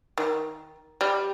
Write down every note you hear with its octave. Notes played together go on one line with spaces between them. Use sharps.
D#3
G3